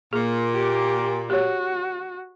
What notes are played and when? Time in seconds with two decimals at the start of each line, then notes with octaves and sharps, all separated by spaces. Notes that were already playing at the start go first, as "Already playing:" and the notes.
0.13 A#2 G#4
0.54 G4
1.30 F#4 G4 C#5